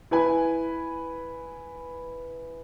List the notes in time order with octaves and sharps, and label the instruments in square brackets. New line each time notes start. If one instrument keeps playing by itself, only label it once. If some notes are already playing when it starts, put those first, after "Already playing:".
[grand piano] E4 B4 G#5